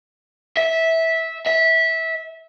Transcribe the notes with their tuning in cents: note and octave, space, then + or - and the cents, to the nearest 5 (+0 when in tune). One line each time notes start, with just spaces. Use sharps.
E5 -15
E5 -20